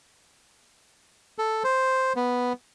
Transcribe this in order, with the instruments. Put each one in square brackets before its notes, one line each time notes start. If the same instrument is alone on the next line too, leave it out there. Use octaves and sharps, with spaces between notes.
[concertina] A4
C5
B3